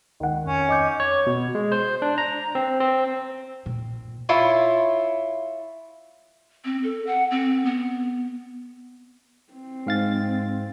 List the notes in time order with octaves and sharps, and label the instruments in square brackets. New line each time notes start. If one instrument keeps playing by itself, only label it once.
[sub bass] C#2 [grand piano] D#3 F#5
[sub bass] F2 [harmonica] C#4
[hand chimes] D#5 D6 G6
[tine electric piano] C#5
B2
G#3
C5
D4
A#5
C4
C4
[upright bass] A#2
[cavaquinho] E4 F4 C#5
[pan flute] C4
A4
F#5
C4
B3
[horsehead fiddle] C4
[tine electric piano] G#2 F5 A6